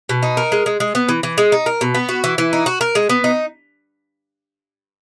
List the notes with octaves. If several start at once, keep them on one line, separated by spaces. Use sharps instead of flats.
B2
D#4
A#4
G#3
G#3
G#3
B3
E3
E3
G#3
D#4
A#4
B2
B3
F#4
E3
E3
D#4
F#4
A#4
G#3
B3
D#4